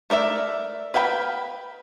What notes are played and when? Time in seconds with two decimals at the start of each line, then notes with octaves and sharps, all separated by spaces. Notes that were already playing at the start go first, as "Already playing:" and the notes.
0.10 A3 A#4 D5 E5
0.94 B4 F5 G5 G#5 B5